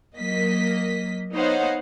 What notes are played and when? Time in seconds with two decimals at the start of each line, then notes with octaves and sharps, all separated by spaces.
0.16 F#3 A#3 D#5 B6
1.33 B3 D#4 C5 C#5 F5 F#5